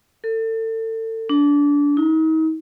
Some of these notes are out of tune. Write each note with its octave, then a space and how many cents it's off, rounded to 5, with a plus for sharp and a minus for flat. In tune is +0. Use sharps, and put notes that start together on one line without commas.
A4 +30
D4 -25
D#4 +35